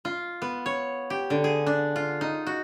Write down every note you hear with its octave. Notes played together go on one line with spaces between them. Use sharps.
F4
B3
C#5
G4
D3
G#4
D4
F4
D#4
F#4